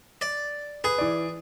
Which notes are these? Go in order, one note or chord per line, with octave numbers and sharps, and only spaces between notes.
D5
G#4 B4
E3 D5